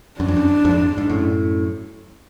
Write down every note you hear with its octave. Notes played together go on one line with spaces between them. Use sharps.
F#2 D4
F2
F#2
F2 G#2
G#2
F#2 A2